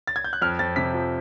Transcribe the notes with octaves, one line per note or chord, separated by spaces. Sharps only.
A6
G#6
G6
F#6
F2 F6
F2 A6
C3 B6
F3